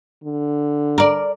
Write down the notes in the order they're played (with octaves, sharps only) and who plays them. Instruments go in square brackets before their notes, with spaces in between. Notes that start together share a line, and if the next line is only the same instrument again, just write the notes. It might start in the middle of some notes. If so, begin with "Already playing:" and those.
[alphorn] D3
[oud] A#4 D5